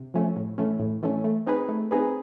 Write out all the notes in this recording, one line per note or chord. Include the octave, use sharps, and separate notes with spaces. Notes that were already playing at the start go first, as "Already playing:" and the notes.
Already playing: C3
F3 A3 C#4
A2
E3 A3 C#4
A2
E3 A3 C#4
A3
C4 D#4 G#4 B4
A3
C4 D#4 G#4 B4